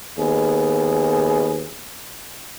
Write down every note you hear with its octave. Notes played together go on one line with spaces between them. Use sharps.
D#2 B3 G#4